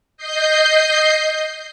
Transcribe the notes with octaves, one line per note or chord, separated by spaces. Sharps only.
D#5 G6 C7